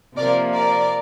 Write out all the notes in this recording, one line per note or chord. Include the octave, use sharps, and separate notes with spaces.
C3 F3 A#3 A#4 D5
A#4 D5